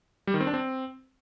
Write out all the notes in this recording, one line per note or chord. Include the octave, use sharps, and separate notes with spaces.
G3
D#3
C4
D4
C4